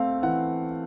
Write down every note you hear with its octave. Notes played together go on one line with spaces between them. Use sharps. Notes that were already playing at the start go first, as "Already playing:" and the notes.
Already playing: A3 C4 F5
E3 F#5